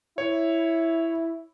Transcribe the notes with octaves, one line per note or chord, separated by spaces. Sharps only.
E4 C#5